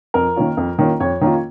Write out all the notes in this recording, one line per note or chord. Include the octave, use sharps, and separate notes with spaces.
F2 A#4
D#3 A#3 C#4 F4
F2
D#3 A#3 C#4 F4
F2 C#5
D#3 A#3 C#4 F4